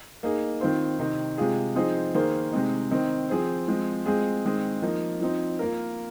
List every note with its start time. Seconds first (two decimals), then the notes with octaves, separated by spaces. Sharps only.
0.23 A#3 D#4 G#4
0.61 D#3 C4 F4 C5
0.99 C3 D#3 C4 D#4
1.38 C3 G#3 F4 G#4
1.76 F3 C4 D#4 G#4 C5
2.14 D#3 A#3 G#4 C5
2.52 C3 G#3 C4 D#4
2.91 D#3 C4 D#4
3.29 F3 C4 G#4 C5
3.68 F3 G#3 C4
4.06 G#3 C4 F4 G#4
4.45 D#3 G#3 C4 G#4
4.82 F3 A#3 D#4
5.21 F3 C4 D#4
5.59 A#3 F4 A#4